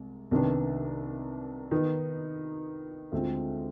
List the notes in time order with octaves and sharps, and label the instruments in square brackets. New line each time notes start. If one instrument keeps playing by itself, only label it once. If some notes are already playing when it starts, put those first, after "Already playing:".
Already playing: [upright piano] C2 G#3
C2 C3 D#3 B3 D4
D#3 B3 D#4
D2 D3 G#3 C4 F4